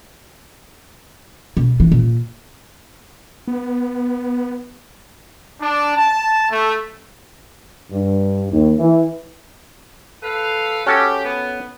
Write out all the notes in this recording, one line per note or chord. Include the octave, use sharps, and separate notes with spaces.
B2
E3
A#2
B3
D4
A5
A3
G2
D#2
E3
A4 B4 F5
C#4 F#4 G4 A4
B3